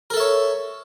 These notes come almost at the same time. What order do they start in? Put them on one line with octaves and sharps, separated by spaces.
A#4 A4 E5 C#5